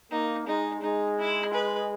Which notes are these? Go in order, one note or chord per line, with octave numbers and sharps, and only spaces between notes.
A#3 D#4
G#3 D#4
G#3 D#4
E4
B4